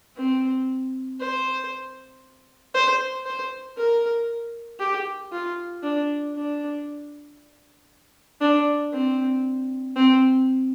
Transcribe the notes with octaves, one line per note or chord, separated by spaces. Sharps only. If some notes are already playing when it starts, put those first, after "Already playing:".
C4
C5
C5
C5
A#4
G4
F4
D4
D4
D4
C4
C4